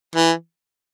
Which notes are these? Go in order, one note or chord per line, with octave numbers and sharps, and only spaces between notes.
E3